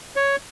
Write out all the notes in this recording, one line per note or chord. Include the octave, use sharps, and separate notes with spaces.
C#5